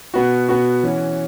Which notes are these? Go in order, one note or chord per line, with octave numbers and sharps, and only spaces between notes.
B2 B3 F#4
B2 B3 F#4
E3 C#4 F#4